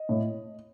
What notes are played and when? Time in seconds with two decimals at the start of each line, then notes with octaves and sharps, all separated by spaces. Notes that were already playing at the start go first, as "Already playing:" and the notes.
Already playing: D#5
0.09 A2